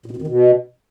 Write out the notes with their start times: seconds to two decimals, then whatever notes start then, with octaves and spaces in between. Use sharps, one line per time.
0.06 A#2
0.11 B2
0.17 F2
0.22 D#3
0.27 B2